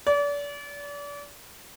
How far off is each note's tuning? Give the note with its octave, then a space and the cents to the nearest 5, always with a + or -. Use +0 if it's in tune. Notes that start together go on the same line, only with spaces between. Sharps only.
D5 -35